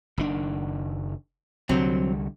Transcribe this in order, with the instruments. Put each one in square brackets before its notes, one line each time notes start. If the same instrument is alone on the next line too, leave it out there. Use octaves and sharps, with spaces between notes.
[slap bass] F#1 D#3 D4
[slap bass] C2 D3 G3 [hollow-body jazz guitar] F#3 C4